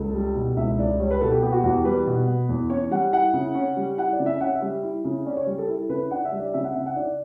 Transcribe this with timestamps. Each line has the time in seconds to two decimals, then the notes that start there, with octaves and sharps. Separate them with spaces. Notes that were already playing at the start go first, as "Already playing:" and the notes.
Already playing: C#2 A4
0.14 G3
0.35 B2
0.57 C#2 E5
0.78 C#2 D5
0.99 G3 C#5
1.11 B4
1.21 B2 A4
1.31 G4
1.42 B3 G4
1.52 F#4
1.64 E2 F#4
1.74 G4
1.85 G3 B4
2.07 B2
2.27 B3
2.49 E2
2.70 C#4 C#5
2.91 G3 F#5
3.12 E4 F#5
3.34 C#3
3.55 C#4
3.77 G3
3.98 E4 F#5
4.13 D5
4.19 C#3
4.26 E5
4.40 C#4 F#5
4.55 E5
4.62 G3
4.83 E4
5.05 C#3
5.26 C#4 D5
5.37 C#5
5.47 G3
5.58 A4
5.68 E4 A4
5.89 C#3 B4
6.11 D4 F#5
6.25 E5
6.32 G3
6.39 D5
6.54 C#3 E5
6.64 F#5
6.75 C#3 E5
6.86 F#5
6.96 D4 D5